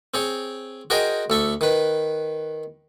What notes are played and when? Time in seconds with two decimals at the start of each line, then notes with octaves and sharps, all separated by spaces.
0.14 C4 G#4 C#5
0.90 F#4 G#4 A#4 C5 D#5 G5
1.30 D2 A4 C#6
1.61 D#3 B4